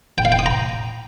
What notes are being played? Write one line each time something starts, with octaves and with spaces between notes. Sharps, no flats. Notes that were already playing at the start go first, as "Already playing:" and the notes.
G5
F5
G5
D#6
A#5